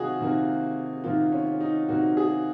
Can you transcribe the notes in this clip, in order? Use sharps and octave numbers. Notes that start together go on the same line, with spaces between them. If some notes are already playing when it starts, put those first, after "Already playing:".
Already playing: C3 D#3 A#3 D#4 F4 F#4 G#4
C3 D#3 A#3
C3 D#3 A#3 F4
C#4
D#4
C3 D#3 A#3 F#4
G#4